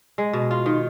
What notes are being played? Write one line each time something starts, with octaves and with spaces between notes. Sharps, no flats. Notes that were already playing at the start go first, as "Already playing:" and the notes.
G#3
B2
F4
D#3